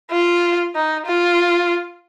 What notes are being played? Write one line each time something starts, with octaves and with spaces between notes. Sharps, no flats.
F4
D#4
F4